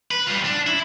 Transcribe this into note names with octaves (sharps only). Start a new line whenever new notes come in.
B4
G3 F4
D4
E4